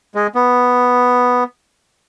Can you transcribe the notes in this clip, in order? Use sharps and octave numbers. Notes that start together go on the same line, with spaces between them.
G#3
B3